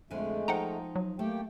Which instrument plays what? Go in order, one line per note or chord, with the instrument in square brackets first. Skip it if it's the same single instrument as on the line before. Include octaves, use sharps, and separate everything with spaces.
[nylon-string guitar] F2 D3 G#5 [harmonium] G#3 A3
[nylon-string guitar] F3 D#4 [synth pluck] F#5 G5 A#5
[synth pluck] F#3
[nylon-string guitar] A3 [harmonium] A#3 G4 G5